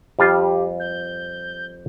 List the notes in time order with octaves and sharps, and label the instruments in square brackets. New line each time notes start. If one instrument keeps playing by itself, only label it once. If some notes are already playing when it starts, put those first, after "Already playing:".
[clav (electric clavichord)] F2 G3 F4 [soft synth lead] G4
[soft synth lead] G6